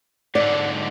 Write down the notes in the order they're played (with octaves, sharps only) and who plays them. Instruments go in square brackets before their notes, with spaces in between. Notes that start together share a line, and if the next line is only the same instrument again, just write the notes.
[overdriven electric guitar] G#2 D3 [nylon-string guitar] D5